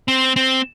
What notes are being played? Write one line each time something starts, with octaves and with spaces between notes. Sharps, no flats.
C4
C4